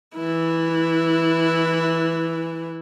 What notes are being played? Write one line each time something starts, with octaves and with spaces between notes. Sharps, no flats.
E3 E4